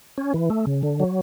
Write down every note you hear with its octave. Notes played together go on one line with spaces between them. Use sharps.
C#4
E3
A3
C#3
D3
F#3